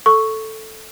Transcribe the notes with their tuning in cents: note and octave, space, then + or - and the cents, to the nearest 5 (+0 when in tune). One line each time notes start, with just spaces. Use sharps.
A4 +0 C#6 +0